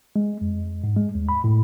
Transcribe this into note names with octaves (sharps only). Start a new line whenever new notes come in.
G#3
F2
G#2
G#3
D#2
B5
A2